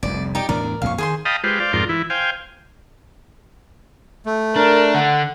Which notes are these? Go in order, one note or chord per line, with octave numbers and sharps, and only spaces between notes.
F1 C2 F2 D5
D#4 G4 D5
E2 A2 D4 A#4 D5
F2 A#2 C#3 F5 C#6
D#3 G#4 C5 C6
D#5 F5 G5 A5 B5 D#6
G#3 F4 G4 B4 C5
C5 D5 F5
F2 G#2 F4 A#4 D5 C6
E3 E4
C5 F5 G5 G#5
A3
D4 A#4
D3 F#5